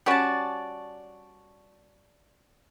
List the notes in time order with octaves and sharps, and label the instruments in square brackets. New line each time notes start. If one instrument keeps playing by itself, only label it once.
[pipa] G3 C#4 F#4 [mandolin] D5 A5